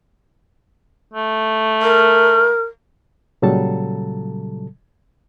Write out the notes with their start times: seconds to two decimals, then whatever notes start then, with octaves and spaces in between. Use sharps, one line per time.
1.14 A3
1.82 A#4
3.42 A#2 C#3 F#3 G3 A4 A5